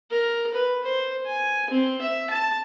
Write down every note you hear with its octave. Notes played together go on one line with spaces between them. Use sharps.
A#4
B4
C5
G#5
C4
E5
A5